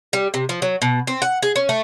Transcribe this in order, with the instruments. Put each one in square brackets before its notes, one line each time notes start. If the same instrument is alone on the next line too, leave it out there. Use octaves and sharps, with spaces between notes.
[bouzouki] G3
C3
F3
F#3
B2
C4
F#5
G#4
C#4
A3